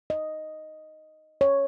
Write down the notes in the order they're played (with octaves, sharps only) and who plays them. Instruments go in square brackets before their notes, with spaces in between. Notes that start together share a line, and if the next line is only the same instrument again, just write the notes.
[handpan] D#5
C#5